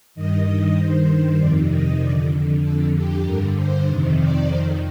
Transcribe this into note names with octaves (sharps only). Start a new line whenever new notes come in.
G2 D#3 D#5
G2 D#3 C5
F2 C3 D#3 D5
D#5
F2 D3 D5
F2 D3 A4
G4
G2 D3 A#4
C5
F2 C3 D#3
D5
F2 D#3 C5